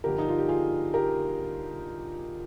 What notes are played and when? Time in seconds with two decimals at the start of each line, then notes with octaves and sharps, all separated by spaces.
0.04 G2 D3 F3 G4 A#4
0.18 D#4
0.28 F4
0.38 G4
0.48 F4 G#4
0.94 G4 A#4